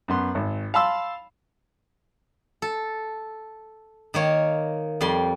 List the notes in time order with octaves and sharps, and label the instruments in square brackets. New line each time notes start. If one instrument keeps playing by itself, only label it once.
[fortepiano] F#2 B3 C6
G#1
F5 A5 B5 C6 E6
[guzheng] A4
D#3 A#3 C#5
F2 G3 C6